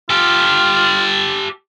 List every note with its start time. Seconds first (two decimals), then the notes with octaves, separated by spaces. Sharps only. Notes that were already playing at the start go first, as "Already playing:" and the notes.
0.10 F4 G4 A4